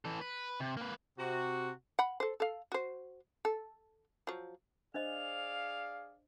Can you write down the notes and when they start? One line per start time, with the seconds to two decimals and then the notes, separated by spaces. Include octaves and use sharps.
0.05 E3 A4
0.21 B4
0.60 C3
0.77 A#3 B4
1.18 C3 F#4
1.99 F#5 B5
2.20 A4 C5
2.40 A4 F5
2.72 F#4 C5
3.45 A4
4.27 F3 F#3
4.94 D4 G#4 C5 D5 D#5 F5 F7